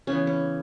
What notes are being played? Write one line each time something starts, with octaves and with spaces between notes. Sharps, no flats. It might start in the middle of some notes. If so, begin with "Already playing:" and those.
C#3 E3 B3 C#4
C#4